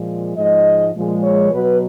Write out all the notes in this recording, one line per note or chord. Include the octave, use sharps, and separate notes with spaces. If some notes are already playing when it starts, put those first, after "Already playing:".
Already playing: A#2 F3 G#3
G#2 F3 G#3 D#5
A#2 F3 G#3
C#5
B2 F#3 B4